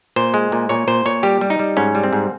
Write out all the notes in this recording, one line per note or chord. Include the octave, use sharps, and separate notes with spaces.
A#2 C5
G#3
A#2
A#2 C#5
A#2 C5
A#2 C#5
G3 G4
G3
D#4
G3
G#2 C#4
G3
C4
G#2